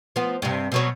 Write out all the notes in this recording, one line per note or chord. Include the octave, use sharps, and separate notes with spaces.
F3 B3
G2 C3
B2 F#3 C#5